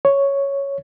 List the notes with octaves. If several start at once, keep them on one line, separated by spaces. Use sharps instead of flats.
C#5